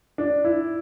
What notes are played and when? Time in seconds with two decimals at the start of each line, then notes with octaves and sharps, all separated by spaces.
0.18 D4
0.45 E4